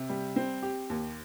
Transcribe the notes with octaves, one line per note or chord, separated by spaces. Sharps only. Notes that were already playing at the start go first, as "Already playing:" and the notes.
Already playing: C3
G3
C4
G4
D#2